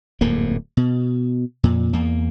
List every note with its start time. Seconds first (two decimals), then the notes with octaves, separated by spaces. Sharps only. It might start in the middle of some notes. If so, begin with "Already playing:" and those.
0.21 D1 F2 G#2 A#3
0.77 B2
1.63 F2 A#2
1.93 E2 A#3